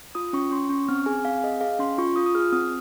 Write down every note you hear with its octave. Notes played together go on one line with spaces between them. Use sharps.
F4 D#6
C#4 C#6
C#4 C6
C#4 C#6
C4 F6
G#4 G#5
C4 F5
G#4 D#5
G#4 F5
C#4 C6
F4 C#6
F4 D#6
D#6
G#4 F6
C4 D#6